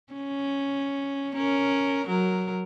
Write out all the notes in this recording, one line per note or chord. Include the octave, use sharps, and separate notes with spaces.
C#4
C#4 A#4
F#3 A#4